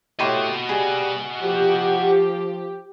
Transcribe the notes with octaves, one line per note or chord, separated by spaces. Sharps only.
A2 F#4 G4 C#5 D#5 C6
G3 G#4
F3 G4